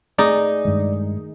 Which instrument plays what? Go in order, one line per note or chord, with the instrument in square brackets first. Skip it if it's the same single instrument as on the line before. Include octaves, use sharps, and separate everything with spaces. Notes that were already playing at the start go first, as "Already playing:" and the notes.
[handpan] A3 G#4 [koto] D#4 [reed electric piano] D5
[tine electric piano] G2 G#3 [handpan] D#3